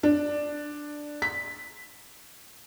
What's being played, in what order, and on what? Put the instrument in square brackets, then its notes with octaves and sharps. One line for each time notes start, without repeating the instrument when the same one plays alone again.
[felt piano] D4
B6